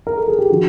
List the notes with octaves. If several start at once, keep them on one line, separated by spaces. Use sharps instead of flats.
A#4
A4
G#4
G4
D3 F3 F#4